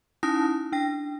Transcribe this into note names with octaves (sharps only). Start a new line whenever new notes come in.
C#4 D#4 E4 A5 D#6 A#6
D4 G5 A#6